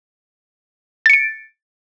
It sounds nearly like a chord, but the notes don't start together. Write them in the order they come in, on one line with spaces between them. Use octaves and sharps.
A6 C#7 D7